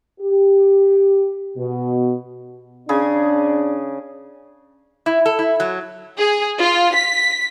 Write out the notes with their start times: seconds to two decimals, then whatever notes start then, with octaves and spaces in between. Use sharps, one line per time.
0.21 G4
1.56 B2
2.89 C#3 D4 G#4
5.06 E4
5.26 A4
5.39 E4
5.60 F#3
6.17 G#4
6.59 F4
6.95 B6